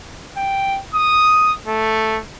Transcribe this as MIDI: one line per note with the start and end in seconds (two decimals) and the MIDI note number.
0.37 0.78 79
0.94 1.51 87
1.67 2.19 57